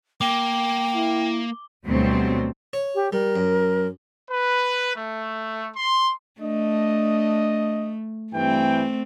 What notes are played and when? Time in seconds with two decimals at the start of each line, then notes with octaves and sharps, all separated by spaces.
0.21 A#3 G5 D6 G7
0.93 E4
1.86 D2 B2 F#3 G3 C4
2.73 C#5
2.95 G4
3.13 G3 A#4
3.36 F#2
4.29 B4
4.95 A3
5.76 C6
6.41 A3 D4 D#5
8.33 G2 E3 A3 C4 G5